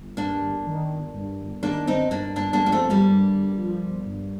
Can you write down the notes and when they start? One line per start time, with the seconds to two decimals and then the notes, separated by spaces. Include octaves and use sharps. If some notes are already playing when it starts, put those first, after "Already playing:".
Already playing: G1
0.17 G2 A#3 D4
0.41 G1
0.66 D#3
0.90 G1
1.14 G2
1.39 G1
1.62 D#3 A#3 D4
1.87 G1 C4 D#4
2.11 G2 A#3 D4
2.36 G1 A#3 D4
2.53 A#3 D4
2.60 F3
2.66 A#3
2.72 A3 C4
2.84 G1
2.90 G3 A#3
3.09 G2
3.33 G1
3.57 F3
3.80 G1
4.05 G2